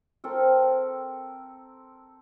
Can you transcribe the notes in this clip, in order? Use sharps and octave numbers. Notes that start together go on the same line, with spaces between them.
C4 A4 A#4